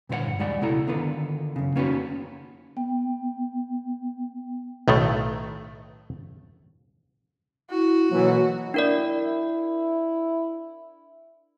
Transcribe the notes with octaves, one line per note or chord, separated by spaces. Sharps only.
G2 A#2 D3 C5 C#5 F#5
D#2 G3 G#3 D5 F#5
C#2 B2 E4 A4 A#5
D3 D#3 B3 F4 B4
F#2 C#3
A#3 B3 C#4 D#4 F#4 B4
B3 G5
B1 A2 D#3 A3
E4 F#4
B2 D3 E3 F#3 A#3
D4 E4 A#4 D5